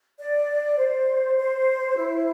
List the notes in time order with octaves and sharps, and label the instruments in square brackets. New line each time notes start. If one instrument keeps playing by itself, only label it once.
[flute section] D5
C5
C5
E4